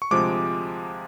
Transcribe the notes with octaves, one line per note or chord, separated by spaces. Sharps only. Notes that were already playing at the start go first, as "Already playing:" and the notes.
C#6
D2 C3 F3 G#3 D6